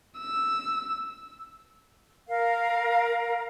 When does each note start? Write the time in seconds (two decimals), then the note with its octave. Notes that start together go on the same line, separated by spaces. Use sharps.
0.18 E6
2.28 A#4 F5